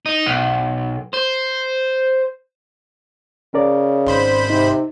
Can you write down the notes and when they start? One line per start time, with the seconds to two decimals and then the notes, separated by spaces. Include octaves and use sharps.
0.06 D#4
0.26 B1
1.13 C5
3.54 C#3 C#4 A#4 D5
4.06 G#1 C5 B5
4.50 C3 D#4